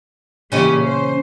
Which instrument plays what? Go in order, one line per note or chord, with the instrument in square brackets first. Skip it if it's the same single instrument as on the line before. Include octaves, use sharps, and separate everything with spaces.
[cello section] A#2 E3 G4 [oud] C#3 C#4 D#5
[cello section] C5